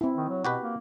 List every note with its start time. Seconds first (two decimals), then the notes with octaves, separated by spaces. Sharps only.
0.01 C4 E4
0.16 D#3
0.29 F#3
0.45 B2 F#4 G4 B4
0.62 A#3